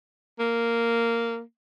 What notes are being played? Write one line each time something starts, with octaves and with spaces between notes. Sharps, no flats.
A#3